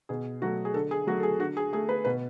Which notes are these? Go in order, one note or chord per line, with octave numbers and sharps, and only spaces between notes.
B2 G#4
F#3 A3 F#4
G#4
D3 A4
G#4
F#3 A3 F#4
A4
G#4
D3 F#4
G#4
A3 G#4
B4
B2 B4